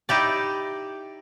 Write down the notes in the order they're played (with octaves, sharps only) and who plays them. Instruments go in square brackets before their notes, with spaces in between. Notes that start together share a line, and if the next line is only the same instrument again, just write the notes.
[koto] D#4 E4 G4 D5